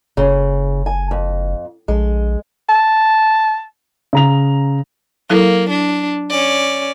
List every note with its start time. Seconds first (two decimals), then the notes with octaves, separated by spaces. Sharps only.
0.17 F#1 C#3
0.86 G#5
1.11 F2
1.88 A#1 G#3
2.69 A5
4.13 C#3 A#5 F7
5.30 F#3 A#3 E4 A4
5.70 D4
6.30 C#4 D5